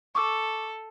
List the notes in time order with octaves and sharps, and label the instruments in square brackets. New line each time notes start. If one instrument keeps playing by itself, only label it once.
[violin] A4 [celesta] C#6 D6 E6